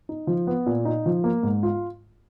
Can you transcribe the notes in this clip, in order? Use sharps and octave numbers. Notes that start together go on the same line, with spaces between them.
D#4
F3
B3
A#2
D#4
F3
A#3
G#2
F4